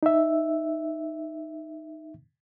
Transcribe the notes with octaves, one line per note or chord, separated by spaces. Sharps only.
D#4 E5